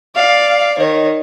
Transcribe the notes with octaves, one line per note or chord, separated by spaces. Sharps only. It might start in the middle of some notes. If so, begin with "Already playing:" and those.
D5 F5
D#3 C#5